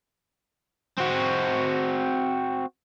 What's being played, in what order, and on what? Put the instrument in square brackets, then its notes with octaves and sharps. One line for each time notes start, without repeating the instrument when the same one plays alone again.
[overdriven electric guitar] C4 F#4